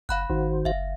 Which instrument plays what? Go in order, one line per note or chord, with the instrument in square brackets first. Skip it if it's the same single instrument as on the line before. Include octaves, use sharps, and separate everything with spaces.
[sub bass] F#1 [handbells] F5 B5 F#6 [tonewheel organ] F#5
[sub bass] G#1 [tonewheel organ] D#3 F#4 C5
[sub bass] F#1 [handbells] E5 F5